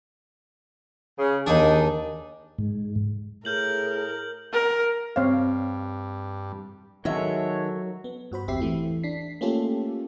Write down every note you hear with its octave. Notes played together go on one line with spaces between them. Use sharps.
C#3
D#2 D4 D#4 G#4
G#2
A2 G#4 A#4 F6 G6 F#7
A#4
G2 C4 C#5 F5
D#3 F#3 G#3 A4 C#5 E5
B3
G2 F#4 C5 B5
A1 E2 C4 G4 E5 C7
E3 A3 E4
D4 B6 C7
A3 A#3 C#4 F4 G4 A4